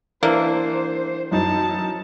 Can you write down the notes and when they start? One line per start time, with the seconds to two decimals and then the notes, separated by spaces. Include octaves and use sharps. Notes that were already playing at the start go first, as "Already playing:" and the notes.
0.23 E3 A#3 D4 C5
1.32 F#2 D#4 E4 A5